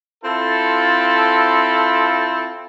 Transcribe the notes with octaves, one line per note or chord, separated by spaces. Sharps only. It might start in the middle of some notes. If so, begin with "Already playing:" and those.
C4 E4 F4 A4